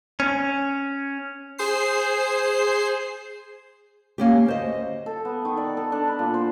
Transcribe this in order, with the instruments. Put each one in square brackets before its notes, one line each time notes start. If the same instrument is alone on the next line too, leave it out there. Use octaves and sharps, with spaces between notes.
[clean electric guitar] C#4
[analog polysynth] G#4 C5 C7
[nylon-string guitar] A#3 C#4 G4
D2 C5 D#5
[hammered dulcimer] A4
B3
D#3
D5
A4
D4
B5
A#2
C5